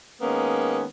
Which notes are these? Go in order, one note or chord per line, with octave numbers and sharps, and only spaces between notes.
D#3 G#3 A#3 B3 C#4